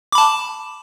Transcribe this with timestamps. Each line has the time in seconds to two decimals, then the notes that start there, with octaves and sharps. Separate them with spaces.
0.12 D6
0.15 B5
0.18 A5